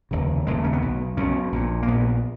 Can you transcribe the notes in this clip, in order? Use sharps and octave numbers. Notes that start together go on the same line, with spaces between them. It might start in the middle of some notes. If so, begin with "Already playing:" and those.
F1 D#2 C#3
F1 D#2 C#3 G#3
C#4
B3
B1 B2
B1 B2 C#4
A#1 A#2
A#3
A#1 A#2 B3